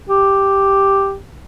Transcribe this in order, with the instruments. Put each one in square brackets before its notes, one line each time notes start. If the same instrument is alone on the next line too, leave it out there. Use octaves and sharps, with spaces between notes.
[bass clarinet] G4